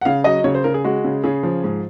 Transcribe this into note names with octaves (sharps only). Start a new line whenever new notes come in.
F#5
C#3 F5
F#3 D#5
C#3 C#5
C5
C#3 A#4
G#4
G#3 F#4
C#3
C#3 G#4
F3
G#2